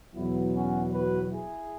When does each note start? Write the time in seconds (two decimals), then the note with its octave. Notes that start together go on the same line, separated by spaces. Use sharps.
0.14 E2 B2 F#3 B3 E4
0.53 C#4 F#4
0.91 F#4 B4
1.31 E4 G#4